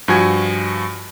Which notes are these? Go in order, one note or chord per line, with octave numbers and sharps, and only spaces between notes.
G2 F3 F#4 G#5 G#6